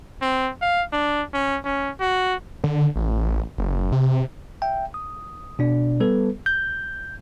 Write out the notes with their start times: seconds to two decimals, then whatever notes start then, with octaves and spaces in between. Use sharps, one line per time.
0.21 C4
0.62 F5
0.92 D4
1.34 C#4
1.65 C#4
2.00 F#4
2.64 D3
2.96 A1
3.58 F#1
3.92 C3
4.62 E5 G5
4.94 D#6
5.59 B2 D4 D5
6.00 G3 B3 A4 B4
6.46 G6